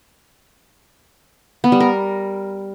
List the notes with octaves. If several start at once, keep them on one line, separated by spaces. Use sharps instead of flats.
B3
G3
A#4